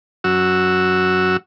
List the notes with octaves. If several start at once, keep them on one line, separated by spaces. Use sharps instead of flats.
F#2 F#4 E6